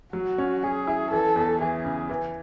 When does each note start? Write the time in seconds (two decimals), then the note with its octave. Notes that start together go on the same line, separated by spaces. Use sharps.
0.13 F#3 F#4
0.38 C#4
0.63 C#4 G#4
0.87 E4
1.11 E3 A4
1.36 E2
1.60 E3 G#4
1.85 C#3
2.09 E3